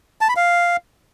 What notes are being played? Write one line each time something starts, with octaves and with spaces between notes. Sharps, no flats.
A5
B5
F5